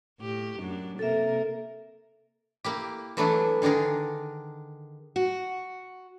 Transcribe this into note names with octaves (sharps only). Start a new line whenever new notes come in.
A2 G4
F#2 D4
C3 A#3 A4 A#4 E5
A#3 E4 G4
E3 F#3 A3 B3 D4 E4
D3 D#3 D4 G#4 A#4
F#4